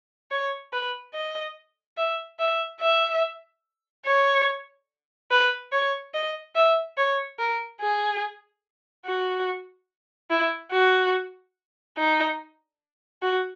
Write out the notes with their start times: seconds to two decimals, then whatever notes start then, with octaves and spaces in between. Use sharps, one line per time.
0.31 C#5
0.73 B4
1.14 D#5
1.97 E5
2.39 E5
2.81 E5
4.06 C#5
5.31 B4
5.72 C#5
6.14 D#5
6.55 E5
6.98 C#5
7.39 A#4
7.81 G#4
9.06 F#4
10.30 E4
10.72 F#4
11.98 D#4
13.22 F#4